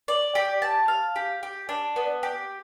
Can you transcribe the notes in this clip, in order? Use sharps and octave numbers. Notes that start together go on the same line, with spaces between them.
D5
G4
A5
F5
G4
G4
D4
B3
G4